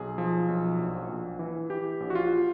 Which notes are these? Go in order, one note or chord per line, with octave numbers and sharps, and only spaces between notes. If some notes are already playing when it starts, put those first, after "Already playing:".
Already playing: B1 G#4
F3
B1
A#1
A#1
E3
E3 G4
A#1
F#4
F4